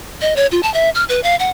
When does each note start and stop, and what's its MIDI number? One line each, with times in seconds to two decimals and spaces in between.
0.21 0.36 75
0.36 0.47 73
0.51 0.61 65
0.63 0.72 81
0.74 0.90 76
0.95 1.04 89
1.09 1.21 71
1.23 1.36 77
1.39 1.50 78